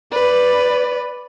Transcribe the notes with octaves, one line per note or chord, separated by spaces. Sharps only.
B4 D5